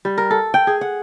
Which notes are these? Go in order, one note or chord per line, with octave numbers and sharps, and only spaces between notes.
G3
A#4
A4
G5
G#4
F#5